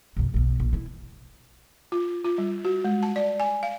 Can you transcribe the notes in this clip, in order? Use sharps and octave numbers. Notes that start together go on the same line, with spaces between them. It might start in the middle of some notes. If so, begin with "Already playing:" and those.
B1 F#2
B1 B2
A#1
D3 E4
F4
F4
G3
F#4
G#3
A5
D5
G#5
F5